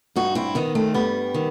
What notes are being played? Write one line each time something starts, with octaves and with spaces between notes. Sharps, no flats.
G2 D#4 F#4
C4 E4
D#3 B3 D#4
A3 C4
G2 G3 B3
D#3